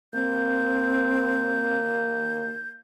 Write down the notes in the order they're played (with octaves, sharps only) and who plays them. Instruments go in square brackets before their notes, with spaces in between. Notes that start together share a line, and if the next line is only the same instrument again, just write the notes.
[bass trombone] A#3 [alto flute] C4 [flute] G6